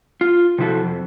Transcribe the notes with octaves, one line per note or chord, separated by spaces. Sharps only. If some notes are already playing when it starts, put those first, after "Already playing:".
F4
C3 F3 E4 F#4 A4
F2